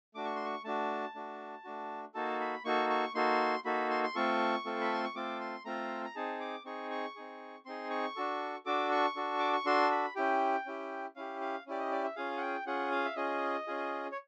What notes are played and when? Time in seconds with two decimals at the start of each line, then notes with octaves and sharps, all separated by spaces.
0.15 A3 D4 F#4 D6
0.25 C#6
0.36 C6
0.45 C#6
0.64 A3 D4 F#4 A5
1.15 A3 D4 F#4
1.64 A3 D4 F#4
2.14 A#3 D#4 F#4 A4 A5
2.40 B5
2.65 A#3 D#4 F#4 A4 C#6
2.90 C#6
3.15 A#3 D#4 F#4 A4 C6
3.65 A#3 D#4 F#4 A4 B5
3.90 C6
4.04 C6
4.15 A3 C4 F4 A4 C#6
4.65 A3 C4 F4 A4
4.81 B5
4.93 C6
5.04 C#6
5.15 A3 C4 F4 A4 D6
5.40 C6
5.65 A3 C4 F4 A4 A#5
6.05 A#5
6.16 C4 D#4 G#4 A5
6.40 D6
6.65 C4 D#4 G#4 C#6
6.91 C#6
7.16 C4 D#4 G#4
7.65 C4 D#4 G#4 C6
7.90 C#6
8.16 D4 F#4 A4
8.66 D4 F#4 A4 D6
8.91 C#6
9.16 D4 F#4 A4
9.39 D6
9.53 C#6
9.66 D4 F#4 A4 C6
9.91 B5
10.16 C#4 E4 G4 G5
10.66 C#4 E4 G4
11.16 C#4 E4 G4 F5
11.41 F5
11.66 C#4 E4 G4 D5
11.79 D#5
11.91 D5
12.04 E5
12.16 C#4 F4 G#4 F5
12.37 F#5
12.42 G5
12.66 C#4 F4 G#4 F#5
12.91 F5
13.06 E5
13.16 C#4 F4 G#4 D#5
13.67 C#4 F4 G#4
14.12 C#5